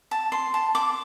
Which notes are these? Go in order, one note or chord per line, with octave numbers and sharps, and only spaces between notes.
A5
C6
A5
D6